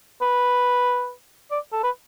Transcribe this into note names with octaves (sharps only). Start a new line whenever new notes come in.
B4
D5
A4
B4